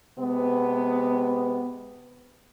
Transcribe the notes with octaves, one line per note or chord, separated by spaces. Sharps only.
C3 G#3 B3